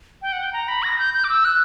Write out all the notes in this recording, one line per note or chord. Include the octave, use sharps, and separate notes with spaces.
G5
F#5
G5
A#5
B5
A#6
G6
G6
D6
E6
F#6